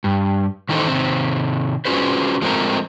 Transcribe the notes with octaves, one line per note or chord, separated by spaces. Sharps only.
G2
D#3 E3 D#4 A4 C5
C3 D#3 C4
C#4 F4 F#4 G#4 B4 C5
F3 G#3 A3 C4 A#4